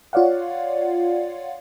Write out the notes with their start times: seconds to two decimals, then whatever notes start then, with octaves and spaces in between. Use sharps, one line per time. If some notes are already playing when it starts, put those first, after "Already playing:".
0.13 F4 C#5 D5 F5 F#5